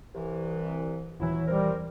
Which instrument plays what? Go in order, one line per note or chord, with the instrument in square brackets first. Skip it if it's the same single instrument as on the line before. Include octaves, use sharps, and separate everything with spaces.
[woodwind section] C2 E3
[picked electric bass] D#1 E3 [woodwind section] F#3 E4
[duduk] G3 [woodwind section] C4 A#4